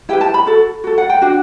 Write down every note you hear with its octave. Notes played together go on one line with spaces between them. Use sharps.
E4 G4 B4 G5
A5
B5
F#4 A4
F#4 A4
F#5
G5
D4 F#4